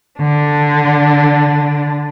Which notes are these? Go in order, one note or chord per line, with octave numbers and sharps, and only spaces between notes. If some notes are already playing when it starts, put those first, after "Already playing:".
D3 D4